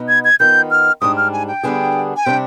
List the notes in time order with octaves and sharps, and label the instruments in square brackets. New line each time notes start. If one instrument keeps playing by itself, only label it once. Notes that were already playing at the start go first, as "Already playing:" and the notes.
Already playing: [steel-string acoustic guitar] B2 B3 D#4 B4
[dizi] G#6
G#6
[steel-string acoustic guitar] D#3 B3 F4 [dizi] G6
[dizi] F6
[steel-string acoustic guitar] G#2 G3 D4 [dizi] D#6
[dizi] F6
G#5
G5
[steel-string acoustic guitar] D3 G3 B3 D4 G#4
[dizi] G#5
[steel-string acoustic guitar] C3 G3 D4 [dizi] G5